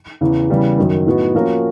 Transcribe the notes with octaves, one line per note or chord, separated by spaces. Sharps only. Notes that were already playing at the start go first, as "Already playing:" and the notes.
E2 C#3 E3
C#3 E3 G3 B3
F#2 D#3 F#3
A2 F#3 B3 D#4 F#4
F3 A#3 C#4 F#4 A#4